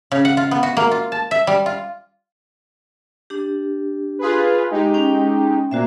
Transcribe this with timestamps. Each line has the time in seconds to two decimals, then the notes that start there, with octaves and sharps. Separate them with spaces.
0.12 C#3
0.25 F#5
0.37 F4
0.51 B3
0.63 F#4
0.77 A#3
0.91 F4
1.12 A5
1.31 E5
1.47 G3
1.66 F4
3.30 D4 G4
4.19 F4 G#4 B4
4.71 G#3 D#4 G4
4.94 C#4 G5
5.71 A#2 A#3 F#4 C5 E5